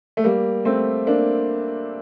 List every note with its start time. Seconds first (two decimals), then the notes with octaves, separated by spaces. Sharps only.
0.17 A3
0.24 G3 A#3
0.65 A3 C4
1.07 A#3 D4